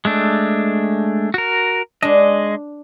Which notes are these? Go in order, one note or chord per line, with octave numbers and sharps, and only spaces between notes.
G#3 A3 D4
F#4 A#4
G#3 D4 D#5